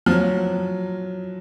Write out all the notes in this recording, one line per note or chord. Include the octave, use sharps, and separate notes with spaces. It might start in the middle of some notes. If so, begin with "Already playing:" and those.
F3
F#3